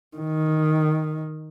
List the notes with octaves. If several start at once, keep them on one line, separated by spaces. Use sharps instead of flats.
D#3